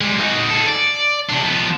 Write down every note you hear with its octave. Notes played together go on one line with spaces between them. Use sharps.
G3 G#3
D#4 F#4
G#4 A4
D5
C3 D4
F3 B3